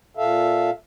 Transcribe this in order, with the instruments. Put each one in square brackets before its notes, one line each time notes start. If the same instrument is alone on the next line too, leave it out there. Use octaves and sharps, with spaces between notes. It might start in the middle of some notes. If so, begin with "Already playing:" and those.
[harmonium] A#2 A4 E5 F5